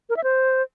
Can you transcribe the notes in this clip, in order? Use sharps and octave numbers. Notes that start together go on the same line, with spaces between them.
A#4
E5
C5